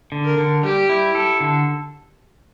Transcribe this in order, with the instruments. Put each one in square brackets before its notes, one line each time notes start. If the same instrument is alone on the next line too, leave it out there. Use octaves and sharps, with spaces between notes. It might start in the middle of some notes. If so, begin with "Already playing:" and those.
[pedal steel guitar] D3
[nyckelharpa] A#4
[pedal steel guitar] D3
[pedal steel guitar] G3 [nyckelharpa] G4
[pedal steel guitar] E4
A4
D3